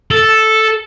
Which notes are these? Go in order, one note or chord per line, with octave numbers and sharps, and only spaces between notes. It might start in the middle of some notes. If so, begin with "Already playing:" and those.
A4